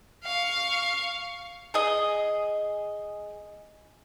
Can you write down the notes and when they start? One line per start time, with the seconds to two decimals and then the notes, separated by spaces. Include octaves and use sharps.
0.24 F5 C#6
1.74 G#4 D#5